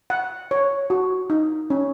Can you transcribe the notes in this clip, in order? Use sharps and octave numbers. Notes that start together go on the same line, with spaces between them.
F#5
C#5
F#4
D#4
C#4